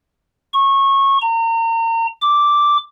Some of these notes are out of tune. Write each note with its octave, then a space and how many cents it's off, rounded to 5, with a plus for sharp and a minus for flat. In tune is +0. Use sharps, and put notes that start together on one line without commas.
C#6 -20
A#5 -35
D6 -5